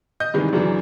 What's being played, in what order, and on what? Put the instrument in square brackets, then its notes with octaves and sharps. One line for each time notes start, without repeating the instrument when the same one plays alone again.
[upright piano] D#5 G6
G2 C3 D#3 E3 G#3 D#4
F#2 C#3 E3 F#3 D4